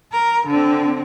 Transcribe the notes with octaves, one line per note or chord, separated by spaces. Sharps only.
A#4
D3 C4